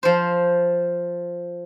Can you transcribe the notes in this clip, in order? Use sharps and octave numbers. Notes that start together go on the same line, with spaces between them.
F3 C5